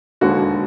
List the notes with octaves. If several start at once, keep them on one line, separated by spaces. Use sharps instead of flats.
E1 D#2 D3 F#4